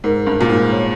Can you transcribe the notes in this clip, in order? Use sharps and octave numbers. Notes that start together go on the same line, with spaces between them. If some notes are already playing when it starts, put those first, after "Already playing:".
G#2 A#4
G2
A#2
G#2
C#5